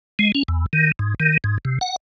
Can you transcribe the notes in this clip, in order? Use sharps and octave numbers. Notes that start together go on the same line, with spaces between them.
G#3
C#4
E2
D#3
G#2
D#3
G#2
C3
F#5